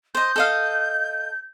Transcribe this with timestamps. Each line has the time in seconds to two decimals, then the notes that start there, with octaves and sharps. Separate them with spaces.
0.15 C5 D#5 G6
0.36 A4 D#5 F5